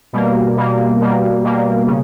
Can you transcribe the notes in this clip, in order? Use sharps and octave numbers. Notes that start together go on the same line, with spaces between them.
B2 G3 A#3
B2 G3 A#3
B2 G3 A#3
B2 G3 A#3
C#3